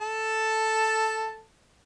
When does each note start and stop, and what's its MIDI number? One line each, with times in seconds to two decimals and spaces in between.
0.01 1.41 69
0.01 1.41 81